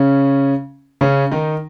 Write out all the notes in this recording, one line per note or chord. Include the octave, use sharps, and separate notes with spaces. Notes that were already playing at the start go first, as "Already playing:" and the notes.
Already playing: C#3 C#4
C#3 C#4
D#3 D#4